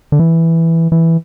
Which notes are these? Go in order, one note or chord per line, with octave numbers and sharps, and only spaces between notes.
D3
E3
E3